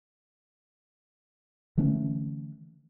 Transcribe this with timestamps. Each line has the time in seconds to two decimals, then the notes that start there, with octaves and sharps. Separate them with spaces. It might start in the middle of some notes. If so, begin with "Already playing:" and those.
1.77 D3 E3 A3 C#4